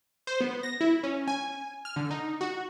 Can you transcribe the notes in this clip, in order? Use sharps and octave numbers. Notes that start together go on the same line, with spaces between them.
C5
B3
A#6
E4
C#4
G#5
F6
D3
D#4
F#4